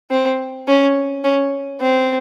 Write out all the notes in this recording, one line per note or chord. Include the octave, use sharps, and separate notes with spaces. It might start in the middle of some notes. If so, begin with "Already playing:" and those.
C4
C#4
C#4
C4